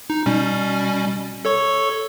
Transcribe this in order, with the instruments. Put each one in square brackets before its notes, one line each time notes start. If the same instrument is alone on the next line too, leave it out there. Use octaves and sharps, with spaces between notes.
[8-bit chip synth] D#4
B2 G3 C#4
A4 C#5 C#6